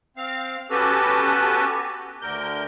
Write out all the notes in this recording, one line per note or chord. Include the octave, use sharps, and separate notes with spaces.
C4 F5
B3 C#4 F#4 G4 A4 B4
D2 D3 A#4 G6